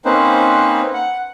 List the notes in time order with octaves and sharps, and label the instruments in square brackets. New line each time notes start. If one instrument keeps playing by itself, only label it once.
[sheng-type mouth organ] A#3 C4 C#4 D#4 B4 C5
F#5